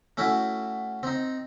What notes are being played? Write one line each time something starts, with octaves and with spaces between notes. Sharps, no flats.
A3 C#4 E4 F#4
C4 D#4